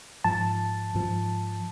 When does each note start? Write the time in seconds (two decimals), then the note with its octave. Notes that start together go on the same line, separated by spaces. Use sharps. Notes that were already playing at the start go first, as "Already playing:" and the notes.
0.24 G#2 F3 A5
0.95 G#2 F3